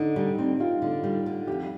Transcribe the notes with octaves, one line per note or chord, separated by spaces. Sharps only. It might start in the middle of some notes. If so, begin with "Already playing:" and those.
Already playing: D3 D#4
G3 D#4
C4
C4 F4
D3
G3
D3
F2 G4